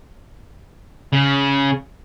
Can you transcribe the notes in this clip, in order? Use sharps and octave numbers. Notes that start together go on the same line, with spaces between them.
C#3